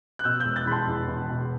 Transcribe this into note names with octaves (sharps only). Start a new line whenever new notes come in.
F#6
B2 E6 G6
E6 G6
E1
F#6 A6
E2 B5
A5 C6
E2
E2
B2